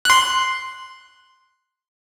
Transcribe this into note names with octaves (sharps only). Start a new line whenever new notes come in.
C6 F#6